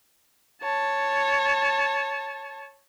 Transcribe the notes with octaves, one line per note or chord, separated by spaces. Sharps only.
C#5 A5